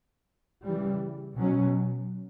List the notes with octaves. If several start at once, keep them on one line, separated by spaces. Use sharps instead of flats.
C#3 E3 G3
B2 F#3 C#4